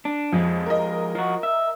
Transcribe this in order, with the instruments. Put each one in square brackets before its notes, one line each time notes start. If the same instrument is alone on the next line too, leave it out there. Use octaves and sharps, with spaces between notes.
[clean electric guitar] D4
[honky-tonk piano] F2 [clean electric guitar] F3 G#3
[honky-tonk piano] A#4 D#5
[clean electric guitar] F3 F#4
E5